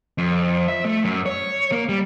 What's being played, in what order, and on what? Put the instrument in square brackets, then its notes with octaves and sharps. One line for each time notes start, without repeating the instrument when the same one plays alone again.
[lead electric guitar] F2
E5
A3
F#2
C#5
A#3
G3